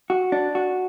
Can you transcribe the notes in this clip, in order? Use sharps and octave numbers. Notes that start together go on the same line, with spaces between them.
F#4
D4
F#4